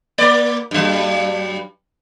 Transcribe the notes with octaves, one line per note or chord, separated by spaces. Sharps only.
A#3 D5
G2 F#3